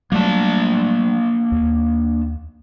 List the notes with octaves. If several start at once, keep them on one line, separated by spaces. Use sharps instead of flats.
F#3 G3 A3 A#3 D4 A5
D#2